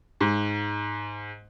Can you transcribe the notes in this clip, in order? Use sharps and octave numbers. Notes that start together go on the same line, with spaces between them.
G#2